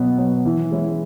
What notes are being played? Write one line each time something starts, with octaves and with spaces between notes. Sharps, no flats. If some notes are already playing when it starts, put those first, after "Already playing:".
Already playing: B2 F#3 B3
F#3 B3
E3
G#3 C#4 E4